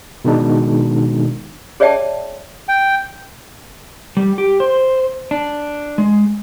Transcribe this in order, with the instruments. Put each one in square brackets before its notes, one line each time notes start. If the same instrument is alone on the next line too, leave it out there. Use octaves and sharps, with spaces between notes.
[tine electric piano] B2 D#3 G#3 D4 D#4
[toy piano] G#4 C#5 D5 E5 G5 A5
[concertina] G5
[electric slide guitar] G3
G4
C5
D4
G#3